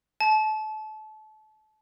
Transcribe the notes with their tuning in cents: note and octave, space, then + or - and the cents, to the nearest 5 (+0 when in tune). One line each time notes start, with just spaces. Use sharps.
A5 -30